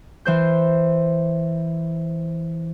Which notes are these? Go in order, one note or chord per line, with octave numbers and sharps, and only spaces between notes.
E3 C5 G6